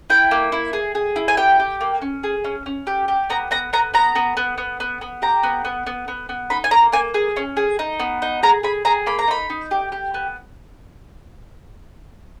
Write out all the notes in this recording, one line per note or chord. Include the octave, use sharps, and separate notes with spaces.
E4 G5
A#3
E4
G#4
G#4
E4
G#5
G4 G5
G4
A#3
C#4
G#4
C#4
C#4
G4
G4
B3 A#5
B3 A#5
B3 A#5
B3 A#5
B3
B3
B3
B3
B3
G4 A#5
B3
B3
B3
B3
B3
D#4 B5
G#5
A#3 A#5
A#3 G#5
G#4
C#4
G#4
D#4
B3
D#4
G#4 A#5
G#4 B5
G#4 A#5
A#3 B5
A#5
D#4 B5
D#4
G4
G4
B3